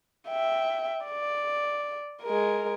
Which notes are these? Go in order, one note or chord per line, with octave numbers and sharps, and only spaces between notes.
E5 G5
D5
G#3 A#4